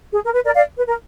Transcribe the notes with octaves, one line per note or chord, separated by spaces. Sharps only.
G#4
A#4
B4
A#4 D5
D5 F5
B4
A#4